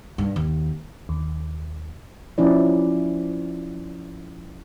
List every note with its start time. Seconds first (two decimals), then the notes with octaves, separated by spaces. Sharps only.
0.18 G2
0.36 D#2
1.09 D#2
2.38 F3 C#4 E4 D5